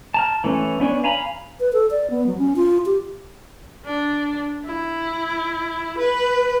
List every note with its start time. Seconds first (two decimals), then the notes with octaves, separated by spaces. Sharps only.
0.14 A5 A#5 F6
0.44 E3 A3 C#4
0.80 B3 C#4 D4 C#5
1.04 F5 G#5 A#5 B5
1.60 B4
1.73 A4
1.91 D5
2.10 B3
2.26 F#3
2.38 C#4
2.56 F4
2.86 G4
3.86 D4
4.65 E4
5.98 B4